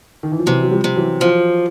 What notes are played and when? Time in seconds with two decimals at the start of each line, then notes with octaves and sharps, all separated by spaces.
0.23 D#3
0.32 E3
0.39 F3
0.46 C3 E3 F#3
0.63 F#3
0.71 F3 G3
0.84 C3
0.95 E3 F#3
1.21 F3